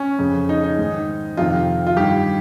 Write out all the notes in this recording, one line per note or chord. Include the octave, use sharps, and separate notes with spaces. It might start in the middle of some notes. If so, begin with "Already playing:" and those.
Already playing: C#4
F2 C#3
D#4
D#4
G#2 D#3
F2 C3 D#3 F4
F4
G2 D#3 G4